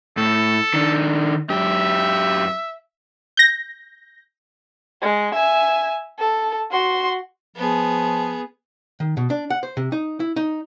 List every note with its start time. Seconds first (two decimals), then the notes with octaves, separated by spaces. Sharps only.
0.17 A2 A4
0.74 D#3 D4
1.50 F#2 G4 E5
3.37 G6 A#6
5.02 G#3
5.35 E5 G#5
6.19 A4
6.72 F#4 C6
7.56 F3 B3 G#4
9.00 D#3
9.17 B2
9.30 D4
9.50 F#5
9.63 C5
9.77 C3
9.92 D#4
10.20 E4
10.36 D#4